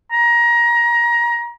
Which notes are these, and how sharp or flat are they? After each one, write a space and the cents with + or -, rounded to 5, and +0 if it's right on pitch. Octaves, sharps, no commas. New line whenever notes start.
A#5 +25